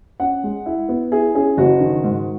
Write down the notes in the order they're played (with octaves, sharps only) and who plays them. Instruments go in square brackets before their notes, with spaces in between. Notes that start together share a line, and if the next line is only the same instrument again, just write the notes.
[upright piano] C#4 F#5
G#3
E4
B3
E4 G#4
C#4 G#4
F#1 F#4
D#3
G#2